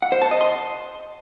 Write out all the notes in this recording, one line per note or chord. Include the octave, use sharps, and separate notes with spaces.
F#5
C5
A5
D#5
C6